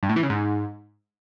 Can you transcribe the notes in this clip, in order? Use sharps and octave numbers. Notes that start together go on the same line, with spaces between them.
G2
A2
E3
C#3
G#2